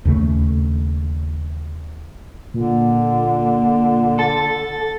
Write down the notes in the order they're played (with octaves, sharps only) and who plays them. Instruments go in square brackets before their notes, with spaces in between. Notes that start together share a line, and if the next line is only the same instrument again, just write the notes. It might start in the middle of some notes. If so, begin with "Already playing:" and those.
[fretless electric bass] D#2 C#3 A3
[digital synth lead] A#2 [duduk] D3
[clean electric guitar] A4 [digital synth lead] A6